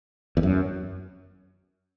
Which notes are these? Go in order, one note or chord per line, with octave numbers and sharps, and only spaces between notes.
E2
F#2